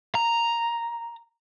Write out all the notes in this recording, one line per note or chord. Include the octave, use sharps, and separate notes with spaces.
A#5